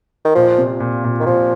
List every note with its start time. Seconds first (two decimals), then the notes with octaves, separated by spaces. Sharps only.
0.25 D#3
0.35 A#2 F3
0.58 C3
0.80 A#2
1.04 A#2
1.20 D#3
1.26 A#2 F3